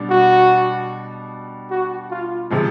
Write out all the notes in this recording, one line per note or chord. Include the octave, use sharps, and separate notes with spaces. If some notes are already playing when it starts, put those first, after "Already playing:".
Already playing: B2 G3 B3 D4
F#4
F#4
F4
C3 F3 G#3